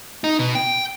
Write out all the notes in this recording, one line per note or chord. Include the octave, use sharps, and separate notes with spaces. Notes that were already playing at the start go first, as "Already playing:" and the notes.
D#4
B2
G5